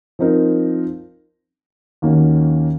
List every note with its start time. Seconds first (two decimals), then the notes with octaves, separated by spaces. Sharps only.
0.19 F3 C4 D#4 A#4
2.02 D#2 D#3 A#3 C#4 F#4